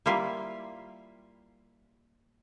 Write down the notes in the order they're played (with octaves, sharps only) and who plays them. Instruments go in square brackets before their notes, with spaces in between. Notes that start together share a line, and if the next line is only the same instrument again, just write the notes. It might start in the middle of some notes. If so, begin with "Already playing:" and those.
[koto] G3 A#3 E4 F4 G#5